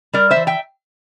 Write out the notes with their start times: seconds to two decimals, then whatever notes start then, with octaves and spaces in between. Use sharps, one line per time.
0.13 G3 A#4 D5
0.30 C5 E5
0.36 E3
0.47 E5 G5